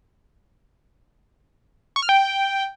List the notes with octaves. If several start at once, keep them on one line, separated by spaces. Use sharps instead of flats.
C#6
F6
G5